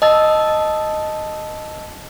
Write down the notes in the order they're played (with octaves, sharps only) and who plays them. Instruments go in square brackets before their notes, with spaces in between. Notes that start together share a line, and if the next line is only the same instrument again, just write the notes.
[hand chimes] D#5 A5 E6 A6